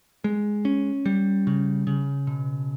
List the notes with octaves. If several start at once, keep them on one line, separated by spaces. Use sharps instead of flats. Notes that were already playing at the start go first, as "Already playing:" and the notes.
G#3
C#4
G3
C#3
C#3
B2